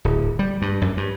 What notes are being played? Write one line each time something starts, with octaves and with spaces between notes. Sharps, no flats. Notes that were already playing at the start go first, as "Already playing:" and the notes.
D1
G3
G2
F#2
G2